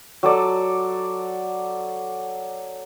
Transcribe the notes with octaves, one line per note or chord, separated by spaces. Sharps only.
F#3 A4 D5